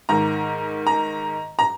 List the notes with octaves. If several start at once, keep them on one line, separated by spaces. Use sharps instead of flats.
G#2 D#3 A#5
A#5
A#5